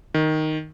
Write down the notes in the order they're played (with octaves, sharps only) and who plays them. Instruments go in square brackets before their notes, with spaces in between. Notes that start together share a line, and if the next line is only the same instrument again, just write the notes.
[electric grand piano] D#3